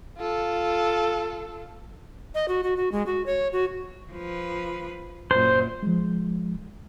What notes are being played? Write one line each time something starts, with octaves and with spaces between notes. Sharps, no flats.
F4 A4
D#5
F#4
F#4
F#4
G#3
F#4
C#5
F#4
F3 B4
F#2 A#2 C5
F3 G#3